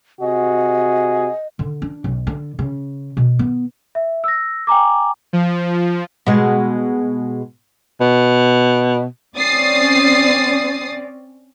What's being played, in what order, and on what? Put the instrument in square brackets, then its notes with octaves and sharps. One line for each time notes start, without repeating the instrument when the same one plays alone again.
[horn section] C3 F#4 G#4 [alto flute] D#5
[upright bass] D3
D4
B1
D3
C#3
B2
B3
[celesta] E5
E6 A#6
G5 G#5 A#5 D6
[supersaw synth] F3
[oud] B2 G#3
[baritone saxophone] B2
[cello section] C4 C#4 D5 [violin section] D#6 A6 C7